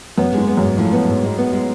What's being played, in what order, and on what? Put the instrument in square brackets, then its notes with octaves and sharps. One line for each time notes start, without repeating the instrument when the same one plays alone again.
[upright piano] F#2 [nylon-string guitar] B3
[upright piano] G#2 [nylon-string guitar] G#3
[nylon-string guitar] B3
[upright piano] F#2
[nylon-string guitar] G#2
[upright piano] A2 [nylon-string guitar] F3
[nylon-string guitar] B3
G#2
G#3
B3
G#3